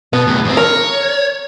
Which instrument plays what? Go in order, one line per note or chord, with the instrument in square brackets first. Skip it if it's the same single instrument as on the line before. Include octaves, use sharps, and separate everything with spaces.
[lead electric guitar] B2 [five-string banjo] B3
[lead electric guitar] E2 A2
E2 C4
[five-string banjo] A#4 [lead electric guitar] C#5